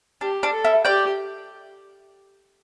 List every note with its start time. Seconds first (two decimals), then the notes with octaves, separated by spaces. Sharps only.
0.21 D4 G4
0.43 D4
0.53 A4
0.65 E4
0.85 G4 D5 G5